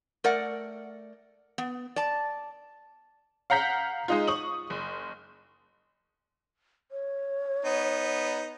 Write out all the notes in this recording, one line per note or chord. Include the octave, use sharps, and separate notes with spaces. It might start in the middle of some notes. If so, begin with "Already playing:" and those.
A3 A#4 D5 F#5
B3
D5 A5
F5 F#5 A#5 G6 B6
G#3 D#4 F4
C#6 D#6 F#7
F#1
C#5
B3 D#4